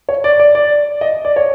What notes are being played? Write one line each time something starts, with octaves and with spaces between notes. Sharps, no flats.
C#5
D5
D5
D5
D#5
D5
C#5